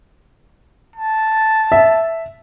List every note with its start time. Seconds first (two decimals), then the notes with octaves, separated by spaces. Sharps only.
0.96 A5
1.72 E5